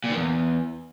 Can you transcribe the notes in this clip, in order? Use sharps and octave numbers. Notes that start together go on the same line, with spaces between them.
A#2
D#3
E2